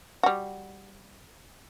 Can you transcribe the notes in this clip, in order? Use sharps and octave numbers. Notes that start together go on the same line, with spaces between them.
G3 F#4